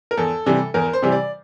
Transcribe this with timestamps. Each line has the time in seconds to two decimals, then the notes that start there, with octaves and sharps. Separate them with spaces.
0.11 A#4
0.17 E2 A4
0.46 C3 E3 G3
0.74 E2 A#4
0.93 C5
1.02 C3 E3 G3
1.12 D5